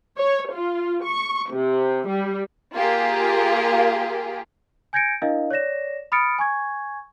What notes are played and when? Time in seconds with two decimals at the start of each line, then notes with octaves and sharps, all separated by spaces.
0.19 C#5
0.52 F4
1.05 C#6
1.52 C3
2.09 G3
2.74 A#3 F4 G4 G#4
4.93 G#5 G6 G#6 A#6 C#7 D7
5.22 D4 E4 A#4 D#5 F5
5.51 C#5 D5 A#6 E7
6.12 B5 D#6 F6 A6 C#7 D7
6.38 G#5 C#6 G#6